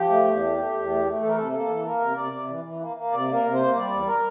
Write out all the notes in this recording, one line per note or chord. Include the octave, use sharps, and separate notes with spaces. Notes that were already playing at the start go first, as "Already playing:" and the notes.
Already playing: F3 G4
A3
E2
A3
A3
E2
A3
A3
E3 A4
A#4
C3 A4
A#3 A4
E3
A#3 A#4
C3
C3 D5
C3
E3
E3
A#3
A#3
C3 D5
A#3 A#4
C3
C5
A#3
G3 D5
E2
A#4